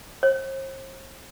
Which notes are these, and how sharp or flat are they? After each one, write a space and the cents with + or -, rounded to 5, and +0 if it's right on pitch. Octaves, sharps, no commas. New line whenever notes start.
C5 +45